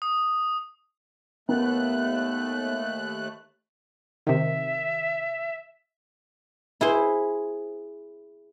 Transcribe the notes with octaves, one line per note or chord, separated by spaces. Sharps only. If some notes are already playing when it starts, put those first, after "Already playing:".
D#6
D#2 A3 B3 A#4 F#6
C3 D#3 E5
E4 G#4 C5